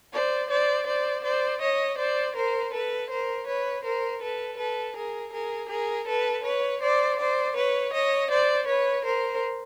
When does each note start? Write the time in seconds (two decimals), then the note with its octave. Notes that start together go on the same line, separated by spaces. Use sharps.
0.13 C5 D5
0.50 C5 D5
0.87 C5 D5
1.24 C5 D5
1.61 C#5 D#5
1.98 C5 D5
2.36 A#4 C5
2.73 A4 B4
3.10 A#4 C5
3.47 B4 C#5
3.84 A#4 C5
4.21 A4 B4
4.58 A4 B4
4.96 G#4 A#4
5.33 G#4 A#4
5.70 G#4 A#4
6.08 A4 B4
6.44 B4 C#5
6.82 C5 D5
7.19 C5 D5
7.56 B4 C#5
7.93 C#5 D#5
8.30 C5 D5
8.68 B4 C#5
9.05 A#4 C5